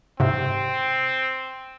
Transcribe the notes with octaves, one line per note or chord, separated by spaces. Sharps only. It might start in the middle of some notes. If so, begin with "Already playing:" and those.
G#2 C3 C4